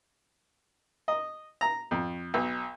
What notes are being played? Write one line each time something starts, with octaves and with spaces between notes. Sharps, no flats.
D#5
A#5
F2
B1